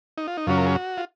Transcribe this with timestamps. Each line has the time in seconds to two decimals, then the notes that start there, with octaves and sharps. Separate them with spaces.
0.18 D#4
0.28 F4
0.37 D#4
0.47 F#2 C#3 F#3 C#4 F4
0.58 A#4
0.67 G#4
0.76 F#4
0.97 F4